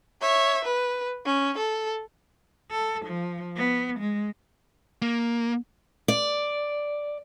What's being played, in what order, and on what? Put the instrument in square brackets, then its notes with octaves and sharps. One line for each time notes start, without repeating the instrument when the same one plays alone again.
[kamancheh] C#5 E5
B4
C#4
A4
[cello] A4
F3
B3
G#3
[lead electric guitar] A#3
[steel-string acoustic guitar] D5